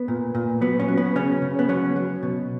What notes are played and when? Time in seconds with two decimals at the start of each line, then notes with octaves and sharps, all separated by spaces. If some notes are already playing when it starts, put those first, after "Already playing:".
Already playing: B3
0.08 A#2
0.35 A#2
0.61 F#3 B3
0.80 C#4
0.88 F#3
0.97 B3
1.15 C#3 C#4
1.42 C#3
1.59 B3
1.69 F#3 C#4
1.96 F#3
2.23 B2